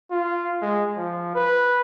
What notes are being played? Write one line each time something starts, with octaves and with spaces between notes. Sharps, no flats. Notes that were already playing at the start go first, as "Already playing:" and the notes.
F4
G#3
F3
B4